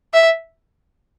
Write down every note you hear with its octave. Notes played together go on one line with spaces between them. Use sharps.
E5